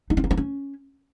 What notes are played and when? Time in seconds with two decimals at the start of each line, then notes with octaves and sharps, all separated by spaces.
0.10 D#4
0.17 C4
0.24 A#3
0.31 C4
0.37 C#4